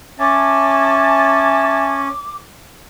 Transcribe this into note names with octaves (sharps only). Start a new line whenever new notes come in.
C#4 E5 G#5 A5 D6